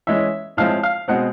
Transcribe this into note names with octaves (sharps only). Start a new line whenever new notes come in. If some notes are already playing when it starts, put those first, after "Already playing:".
E3 G#3 C#4 E4 E5
A2 F3 G#3 C4 E4 F5
F5
B2 G#3 C4 F#5